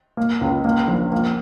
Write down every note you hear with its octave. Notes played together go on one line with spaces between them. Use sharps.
A#3
C#2
A#3
A#1
A#3